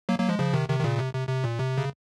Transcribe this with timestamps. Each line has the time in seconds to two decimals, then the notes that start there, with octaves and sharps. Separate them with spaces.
0.09 F#3 A#3
0.19 F#3 A#3
0.29 F3 G#3
0.39 C#3 F3
0.53 C3 D#3
0.69 C3 D#3
0.79 D#3
0.84 A#2 C#3
0.99 C3
1.13 C3
1.29 C3
1.44 A#2
1.59 C3
1.78 C#3